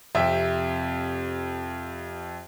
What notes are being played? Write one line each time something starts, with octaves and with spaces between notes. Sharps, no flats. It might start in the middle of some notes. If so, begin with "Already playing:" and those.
F2 C3 E5 G5